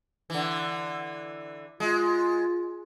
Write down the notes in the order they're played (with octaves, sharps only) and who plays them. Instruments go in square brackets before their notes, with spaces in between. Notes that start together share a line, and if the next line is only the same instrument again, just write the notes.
[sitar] D3 E3
[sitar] G#3 [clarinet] F4